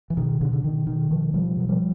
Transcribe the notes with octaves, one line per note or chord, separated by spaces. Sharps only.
E3
B2 D#3
B2 D3
D3
B2 D#3
B2 D#3
B2 D#3 F3
B2 F3 G3
B2 F#3
F3 G3